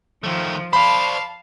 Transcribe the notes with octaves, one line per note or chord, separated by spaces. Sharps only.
D#3 F3 A3
C5 D5 F5 A5 B5